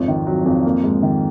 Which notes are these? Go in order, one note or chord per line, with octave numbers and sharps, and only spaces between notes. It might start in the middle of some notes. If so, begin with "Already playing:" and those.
Already playing: G#1 F2
D#3
F#3
F2
A#3
G#2
D#3